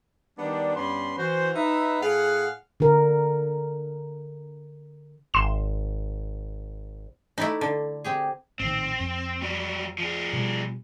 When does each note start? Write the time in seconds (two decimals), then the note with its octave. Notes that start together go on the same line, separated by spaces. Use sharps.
0.38 D#3 G3 B3 D4
0.75 G2 B3 C#4 D4 B5 C6
1.18 E3 F#4 C5
1.56 D#4 B4 E5
2.02 A2 G#4 F5 F#5
2.80 D3 A#4
5.34 G#1 C6 E7
7.38 A3 D#4 E4 D5 B5
7.61 D3
8.04 C4 G4 G#4
8.60 A#1 A2 D#3 C4
9.00 F2
9.42 F#3 G3
9.98 F3 G#4
10.33 B2 G3